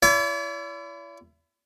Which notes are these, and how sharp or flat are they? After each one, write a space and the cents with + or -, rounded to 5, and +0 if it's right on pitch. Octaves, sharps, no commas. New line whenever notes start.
E4 +30 D5 -45